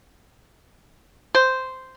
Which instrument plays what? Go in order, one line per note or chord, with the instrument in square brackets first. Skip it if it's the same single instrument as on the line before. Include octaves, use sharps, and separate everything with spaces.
[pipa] C5